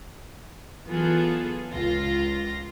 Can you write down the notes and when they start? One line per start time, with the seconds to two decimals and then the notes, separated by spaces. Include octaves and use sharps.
0.88 E3 F#3 B3 F4 G#4 A4
1.72 C#2 F4 A#6